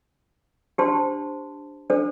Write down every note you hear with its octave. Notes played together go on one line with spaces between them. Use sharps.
D4 G4 C5 A5 C6
D4 A4 C5